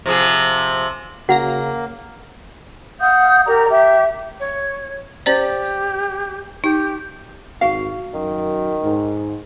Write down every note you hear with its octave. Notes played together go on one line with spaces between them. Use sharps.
C3 F3 G#4
C#3 A#3 F#4 F#5 A#5 A#6
F5 F#5 D#6 G6
G4 A#4 D5 A#5
G4 E5
C#5
C#4 G4 C5 D5
D#4 G4
G#1 F#4 F5
F#2 D#3
G#2